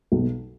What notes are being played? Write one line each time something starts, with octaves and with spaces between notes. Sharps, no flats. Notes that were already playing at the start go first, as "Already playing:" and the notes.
B1